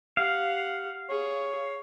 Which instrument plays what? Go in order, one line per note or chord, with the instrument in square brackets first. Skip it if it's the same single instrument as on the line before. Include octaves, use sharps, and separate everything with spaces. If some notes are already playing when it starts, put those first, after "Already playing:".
[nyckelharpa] G4 F#5 [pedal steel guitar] F5
[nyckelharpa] G#4 [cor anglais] C#5